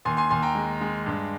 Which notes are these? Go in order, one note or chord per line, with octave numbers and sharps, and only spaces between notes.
D#2 G#5 C6
G#5 C6
D#2 G#5 C6
G5 A#5
G#3
G#3
G2